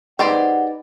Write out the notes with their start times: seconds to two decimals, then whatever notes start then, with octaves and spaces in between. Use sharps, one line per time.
0.19 D#4 G4 G#4 B4 C5 D5 F#5